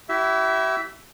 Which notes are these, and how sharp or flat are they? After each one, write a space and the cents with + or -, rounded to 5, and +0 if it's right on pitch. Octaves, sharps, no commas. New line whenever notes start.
E4 +0 G4 -45 E5 +0